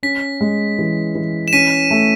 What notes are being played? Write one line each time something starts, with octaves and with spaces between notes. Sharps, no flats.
C#4 B6
G#3
E3
E3
E7
C#4 B6 D#7
A3